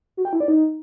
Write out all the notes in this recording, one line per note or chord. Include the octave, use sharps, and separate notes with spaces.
F#4
G5
E4
D5
D#4